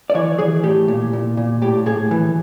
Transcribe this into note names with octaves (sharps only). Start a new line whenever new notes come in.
D5
E3 C#5
E3 G#4
A2 G4
A#2
A#2
A#2
A2 G4
A2 G#4
E3